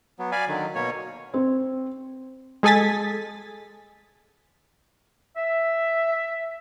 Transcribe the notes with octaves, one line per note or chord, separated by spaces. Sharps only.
F#3 B3
D5 F5 G#5 B5
D3 D#3 F#3
B2 A#3 C#5
C4
G#3 G#4 A4 G#5 A6 B6
E5